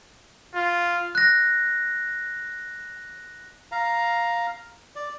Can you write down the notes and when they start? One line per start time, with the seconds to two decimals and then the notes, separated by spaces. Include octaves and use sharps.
0.55 F4
1.15 F#6 A#6
3.72 F5 A#5
4.96 D5